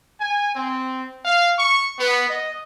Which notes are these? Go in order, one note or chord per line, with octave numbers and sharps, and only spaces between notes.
G#5
C4
F5
C#6
B3
D#5